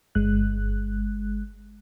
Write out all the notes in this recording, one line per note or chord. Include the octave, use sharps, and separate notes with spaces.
G1 G#3 F#6